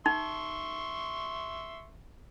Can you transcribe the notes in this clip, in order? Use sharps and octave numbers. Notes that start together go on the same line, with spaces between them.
D#4 E5 C6 C#6